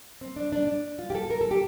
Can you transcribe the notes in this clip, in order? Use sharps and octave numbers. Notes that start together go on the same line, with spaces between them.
C4
D4
D4
D4
F4
G4
A4
A#4
A4
G4